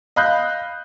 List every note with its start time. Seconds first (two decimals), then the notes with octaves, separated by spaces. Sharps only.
0.16 D#5 F5 B5 F#6 G6